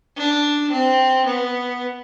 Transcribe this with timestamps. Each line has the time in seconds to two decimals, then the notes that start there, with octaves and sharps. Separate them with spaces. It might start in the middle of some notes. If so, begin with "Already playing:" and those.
0.17 D4
0.71 C4
1.26 B3